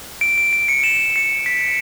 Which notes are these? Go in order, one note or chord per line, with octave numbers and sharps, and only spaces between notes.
D7
D7
D7
C#7
E7
C#7
B6